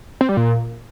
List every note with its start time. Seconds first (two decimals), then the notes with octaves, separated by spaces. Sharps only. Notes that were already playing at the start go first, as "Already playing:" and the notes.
0.21 C4
0.29 G3
0.37 A#2